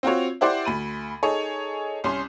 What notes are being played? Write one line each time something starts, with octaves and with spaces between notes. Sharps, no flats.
C4 F4 F#4 C#5
E4 G4 C5 D5 F#5
D2 B5 D#7
D#4 G#4 A4 C#5
C2 C#4 C6